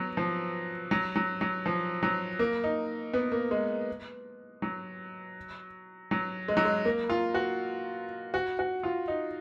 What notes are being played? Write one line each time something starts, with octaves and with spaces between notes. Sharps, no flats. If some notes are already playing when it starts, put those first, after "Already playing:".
Already playing: F#3 B3
F3
F#3
F#3
F#3
F3
F#3
A#3
D#4
B3
A#3
G#3
F#3
F#3
G#3
F#3
G#3
A#3
F4
F#4
F#4
F#4
F4
D#4